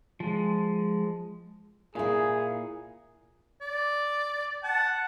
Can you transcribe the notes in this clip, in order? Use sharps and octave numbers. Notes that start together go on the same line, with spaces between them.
F3 G#3
A#2 E4 G#4 F5
D5
F#5 A5